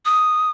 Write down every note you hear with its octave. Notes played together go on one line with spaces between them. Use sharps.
D#6